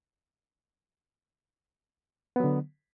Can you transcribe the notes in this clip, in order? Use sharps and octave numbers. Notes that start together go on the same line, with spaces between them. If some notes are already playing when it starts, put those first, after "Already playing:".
D3 F#3 B3